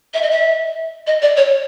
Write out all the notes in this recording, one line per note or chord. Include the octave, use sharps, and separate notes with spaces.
E5
D#5
E5
D#5
D5
C#5